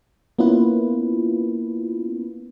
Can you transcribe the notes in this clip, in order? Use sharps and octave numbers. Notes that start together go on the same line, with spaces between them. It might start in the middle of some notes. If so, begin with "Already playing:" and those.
A#3 B3 C#4 E4 F4 B4